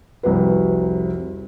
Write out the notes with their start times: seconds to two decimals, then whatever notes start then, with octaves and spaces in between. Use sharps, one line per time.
0.23 F1 C2 F#4 B4